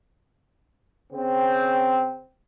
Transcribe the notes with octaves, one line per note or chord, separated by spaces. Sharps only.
C#3 C4